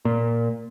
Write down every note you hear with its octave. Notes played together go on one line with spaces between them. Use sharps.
A#2